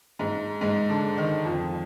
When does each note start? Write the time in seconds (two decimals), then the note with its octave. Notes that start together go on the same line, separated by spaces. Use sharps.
0.19 G#2 G#3
0.61 G#2 G#3
0.89 D3 D4
1.17 D#3 D#4
1.45 F2 F3